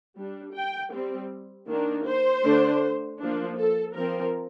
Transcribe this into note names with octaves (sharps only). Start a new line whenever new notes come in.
G3 D4
G5
G3 C4
D#3 A#3 D4
C5
D3 A3 D4
F3 A#3 D4
A4
F3 C4 A#4